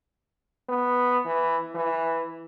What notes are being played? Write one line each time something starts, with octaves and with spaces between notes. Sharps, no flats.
B3
E3
E3